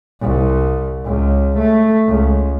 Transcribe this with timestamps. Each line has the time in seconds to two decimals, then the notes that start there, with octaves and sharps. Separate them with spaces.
0.21 C2
1.05 C#2
1.58 A3
2.09 C#2